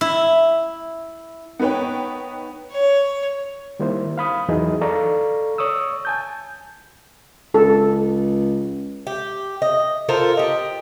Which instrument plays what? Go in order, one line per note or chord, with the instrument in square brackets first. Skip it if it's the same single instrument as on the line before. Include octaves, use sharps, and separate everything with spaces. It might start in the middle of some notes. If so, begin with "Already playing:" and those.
[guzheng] E4
[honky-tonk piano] B3 D#4 B4 C#5 G5
[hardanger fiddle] C#5
[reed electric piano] D#3 G3 A#3 E4 C5
F5 B5 D#6
E2 E3 F#3 D#4 G#4 D#5
A4 D5 F5 A#5 C#6
C#5 C#6 D#6 E6
G#5 A5 G6
[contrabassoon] C#2 [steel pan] A4
[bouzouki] G4
D#5
F4 A4 A#4 C5
G4 D#5